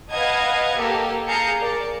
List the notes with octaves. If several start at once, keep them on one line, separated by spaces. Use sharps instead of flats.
B4 D#5 F5 F#5 A5 G#6
A#3 G4 A4
G#4 F5 A5 A#5 G6 C#7
A#4 D5